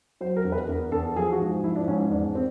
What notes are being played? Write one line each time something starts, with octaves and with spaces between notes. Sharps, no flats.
F#3 C5
A#4
E2
B4
E2 A#4
E2 A4
F3 G#4
F#4
G#2
F3 E4
D4
G#2 C#4
E2 D4
C4